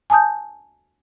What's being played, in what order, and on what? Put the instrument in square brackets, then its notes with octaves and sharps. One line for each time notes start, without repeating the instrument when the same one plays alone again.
[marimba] G#5 A5 D#6 G6